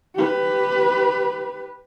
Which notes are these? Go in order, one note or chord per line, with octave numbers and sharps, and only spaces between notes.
G4 B4